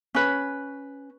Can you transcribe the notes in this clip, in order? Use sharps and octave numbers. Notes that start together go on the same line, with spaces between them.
C#4 B4